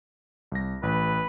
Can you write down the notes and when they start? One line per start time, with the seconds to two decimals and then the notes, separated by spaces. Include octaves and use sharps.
0.52 C2 A#6
0.83 A1 B4